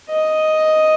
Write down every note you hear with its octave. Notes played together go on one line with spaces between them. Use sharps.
D#5